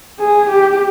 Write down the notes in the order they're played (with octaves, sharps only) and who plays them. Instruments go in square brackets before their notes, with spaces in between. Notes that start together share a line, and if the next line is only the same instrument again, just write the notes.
[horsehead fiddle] G#4
G4